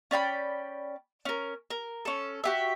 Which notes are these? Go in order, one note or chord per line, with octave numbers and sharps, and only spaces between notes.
C#4 D5 G5 B5
C#4 A#4
A#4
C#4 A4
F#4 G4 E5